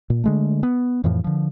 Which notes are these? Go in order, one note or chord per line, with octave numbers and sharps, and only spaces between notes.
A#2
D3 G#3 A3
B3
F2 A2 E3 F3
D3 F3